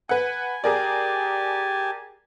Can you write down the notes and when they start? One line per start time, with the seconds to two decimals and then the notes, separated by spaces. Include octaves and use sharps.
0.09 B4 F#5 G#5
0.64 G4 G#4 A#4 D5 G#5 A5